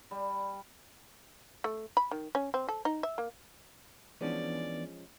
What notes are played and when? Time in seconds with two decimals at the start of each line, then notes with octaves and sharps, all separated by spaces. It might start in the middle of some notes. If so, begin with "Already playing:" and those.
0.11 G3
1.64 A3
1.97 B5
2.11 D#3
2.35 C#4
2.54 C4
2.69 A4
2.85 D#4
3.03 E5
3.18 A#3
4.21 E3 F3 G#3 B3 C#4 D4 D5